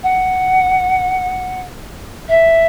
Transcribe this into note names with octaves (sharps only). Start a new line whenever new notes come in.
F#5
E5